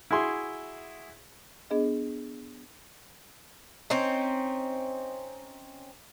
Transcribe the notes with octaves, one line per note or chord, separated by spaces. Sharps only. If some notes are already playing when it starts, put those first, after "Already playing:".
E4 F#4 G#4 C6
B3 D4 G#4 D#5
C4 C#4 D#4